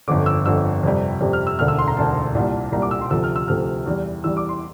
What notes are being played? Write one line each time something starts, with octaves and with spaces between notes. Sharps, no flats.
G1 F2 D3 D6
E6
G1 F2 D3 E6
F2 C3 G3
F2 C3 G3
F6
E6
E1 D2 D3 F6
E6
C6
A#5
E1 D2 D3 A5
C2 A#2 G3
C2 A#2 G3 A#5
D6
E6
C6
D2 C3 F3 A3 E6
F6
E6
D2 C3 F3 A3 F6
E2 E3 G3
E2 E3 G3 E6
D6
C6